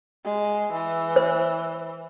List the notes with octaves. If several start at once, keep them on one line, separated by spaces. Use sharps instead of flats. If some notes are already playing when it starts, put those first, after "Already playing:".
G#3
E3
C5